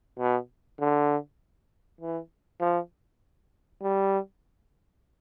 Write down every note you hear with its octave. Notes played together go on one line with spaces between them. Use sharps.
B2
D3
E3
F3
G3